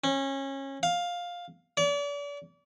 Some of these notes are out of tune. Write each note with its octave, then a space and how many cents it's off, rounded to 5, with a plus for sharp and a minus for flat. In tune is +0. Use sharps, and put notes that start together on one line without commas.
C#4 -25
F5 +10
D5 -40